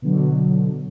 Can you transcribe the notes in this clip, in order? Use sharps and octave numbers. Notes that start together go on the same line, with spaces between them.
B2 D3 F#3